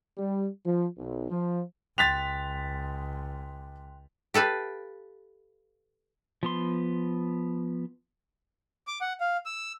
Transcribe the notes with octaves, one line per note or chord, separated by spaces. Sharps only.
G3
F3
B1
F3
C#2 G5 C6 F#6 A6 B6 F7
G4 A4 B4 F5
F3 B3 C6
D6
F#5
F5
E6